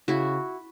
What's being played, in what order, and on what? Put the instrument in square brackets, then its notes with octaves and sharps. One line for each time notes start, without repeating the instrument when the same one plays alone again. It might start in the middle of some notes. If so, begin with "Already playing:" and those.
[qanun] C#3 E4 F#4